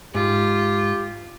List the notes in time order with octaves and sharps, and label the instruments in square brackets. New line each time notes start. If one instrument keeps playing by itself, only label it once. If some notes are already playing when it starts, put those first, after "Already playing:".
[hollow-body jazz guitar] G#2 [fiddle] F4 [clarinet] G4